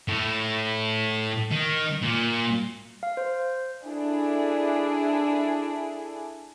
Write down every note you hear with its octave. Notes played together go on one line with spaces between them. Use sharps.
A2
D#3
A#2
F5
C5
D4 E4 G#4 A4